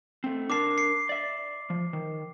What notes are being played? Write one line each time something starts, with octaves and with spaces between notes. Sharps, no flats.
A3 C4
D4 A#4 A5 D6 C7
C7 C#7
D5 E5
F3
D#3